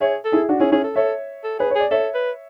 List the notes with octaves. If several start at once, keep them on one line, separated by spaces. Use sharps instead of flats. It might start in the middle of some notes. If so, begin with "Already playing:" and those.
G#4 C#5 E5
A4
E4 G#4
D4 F#4
C#4 E4 G#4
C#4 E4 G#4
A4
A4 C#5 E5
A4
G#4 B4
G#4 C#5
D5
A4 C#5 E5
B4